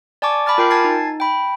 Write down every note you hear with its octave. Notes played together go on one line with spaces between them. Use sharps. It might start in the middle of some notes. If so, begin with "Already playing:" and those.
D5 G#5 A5 C#6 D6
A5 B5 D6 F6 A6
F4 A#4 G5 G6 C7
G#5 A5 G#6 A6 C7
D#4
G5 B5